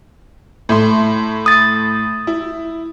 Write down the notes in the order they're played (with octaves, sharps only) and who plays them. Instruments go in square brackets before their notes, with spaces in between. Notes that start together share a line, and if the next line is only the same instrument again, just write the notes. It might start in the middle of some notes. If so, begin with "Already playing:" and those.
[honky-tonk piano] A2 A3 C6
[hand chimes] D#6 A6
[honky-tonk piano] E4